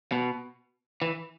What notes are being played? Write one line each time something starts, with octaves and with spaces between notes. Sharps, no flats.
B2
E3